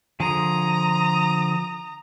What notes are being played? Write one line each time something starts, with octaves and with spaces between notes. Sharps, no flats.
D3 F3 G#4 A#5 D#6